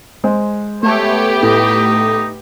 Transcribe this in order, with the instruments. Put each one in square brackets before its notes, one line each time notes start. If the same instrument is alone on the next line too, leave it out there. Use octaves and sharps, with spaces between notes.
[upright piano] G#3 C5
[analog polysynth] A3 [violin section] B3 G4 [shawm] C#5
[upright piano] A2 [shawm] D#4